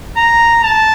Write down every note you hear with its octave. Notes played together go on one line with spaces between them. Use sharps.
A#5
A5